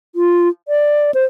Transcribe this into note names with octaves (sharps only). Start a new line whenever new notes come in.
F4
D5
C5